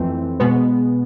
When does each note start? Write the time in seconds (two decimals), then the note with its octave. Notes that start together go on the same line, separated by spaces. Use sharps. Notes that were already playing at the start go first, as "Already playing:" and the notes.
Already playing: F2 E3 A3 C4
0.40 B2 G#3 B3